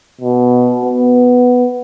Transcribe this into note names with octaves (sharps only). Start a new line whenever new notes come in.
B2
B3